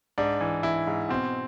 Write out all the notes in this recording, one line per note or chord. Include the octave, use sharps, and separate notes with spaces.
G#2 D4
E3
E3 E4
G#2
B2 C4